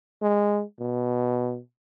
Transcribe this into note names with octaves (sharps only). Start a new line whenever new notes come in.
G#3
B2